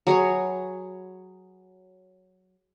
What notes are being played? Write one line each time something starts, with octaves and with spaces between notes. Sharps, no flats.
F#3 G#4 B4 C#5